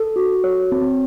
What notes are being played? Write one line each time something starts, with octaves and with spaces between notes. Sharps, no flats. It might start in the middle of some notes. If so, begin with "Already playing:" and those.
Already playing: A4
F#4
C#5
C4